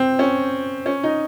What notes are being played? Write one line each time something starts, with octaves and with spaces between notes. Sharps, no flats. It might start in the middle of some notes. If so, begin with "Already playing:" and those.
Already playing: C4
C#4
C#4
D#4